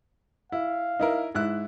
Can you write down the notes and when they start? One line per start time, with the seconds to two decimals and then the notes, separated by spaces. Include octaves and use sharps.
0.52 E4 F5
0.99 D#4 E4 A#4
1.35 G#2 E4 F#6